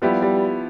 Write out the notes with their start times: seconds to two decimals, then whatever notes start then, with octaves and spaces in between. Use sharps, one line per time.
0.02 F3 G3 B3 E4 G4
0.22 G3